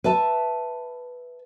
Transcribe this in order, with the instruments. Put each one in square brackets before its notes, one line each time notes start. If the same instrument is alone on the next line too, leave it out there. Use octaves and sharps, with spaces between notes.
[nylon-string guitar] B4 E5 A5